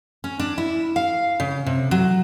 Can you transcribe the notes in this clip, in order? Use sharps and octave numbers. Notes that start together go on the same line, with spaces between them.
C#4
D4
E4
F5
C#3
C3
F#3